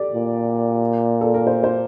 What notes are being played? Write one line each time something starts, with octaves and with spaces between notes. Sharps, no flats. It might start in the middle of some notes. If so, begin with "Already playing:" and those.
Already playing: G4 A4 D5
A#2
A4
A#4
C5
C5